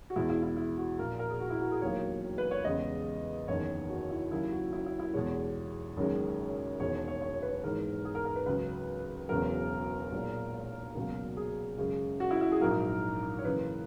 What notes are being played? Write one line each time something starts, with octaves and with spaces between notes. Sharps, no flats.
F#4
E2 B2 G#3 E4
E4
E4
E4
F#4
A#1 A#2 A#3 A#4
A#4
G#4
F#4
E4
F#4
G#4
E1 D#2 D#3 F#3 A#3 C#5
B4
C#5
E2 C#3 G#3 D#5
F#1 E2 D#3 C#5
F#4
E4
D#2 C#3 F#3 A#3 E4
F#4
E4
E4
E4
E2 B2 G#3 C#5
F#1 F#2 D#3 G#3
E1 E2 D#3 C#5
C#5
C#5
B4
G#1 G#2 E3 G#3 A#4
G#4
A#4
A#4
B4
C#2 C#3 F#3 B4
E1 E2 C#3 F#3 A#4
B1 A#2 G#3
C#2 B2 F#3 A#3
G#4
F#2 C#3 G#3
F#4
E4
E4
G#4
A#1 G#2 F#3 A#3 A#4
C#5
F#2 C#3 E3 A#3 B4